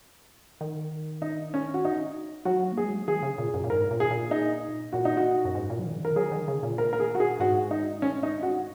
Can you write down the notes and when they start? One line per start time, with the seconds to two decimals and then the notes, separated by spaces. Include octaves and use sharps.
0.61 D#3
1.22 D#4
1.54 C#4
1.74 F#4
1.85 D#4
2.45 F#3 F#4
2.72 A#3
2.77 G#4
2.83 G#3
2.96 F#3
3.08 D#3 G#4
3.23 C#3
3.38 A#2
3.54 F#2
3.64 A#2
3.70 G#2 A#4
3.91 A#2
4.00 G#4
4.11 A#2
4.31 D#4
4.93 A#2 F#4
5.05 D#4
5.17 F#4
5.45 F#2
5.55 G#2
5.70 A#2
5.79 F#3
5.85 D#3
5.98 C#3
6.01 D#3 A#4
6.16 F#3 G#4
6.32 D#3
6.48 C#3
6.63 A#2
6.78 A#4
6.93 A#4
7.00 G#4
7.15 F#4
7.20 G#4
7.40 G#2 F#4
7.71 D#4
8.02 C#4
8.23 D#4
8.43 F#4